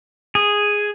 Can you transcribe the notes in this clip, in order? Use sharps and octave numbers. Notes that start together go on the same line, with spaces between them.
G#4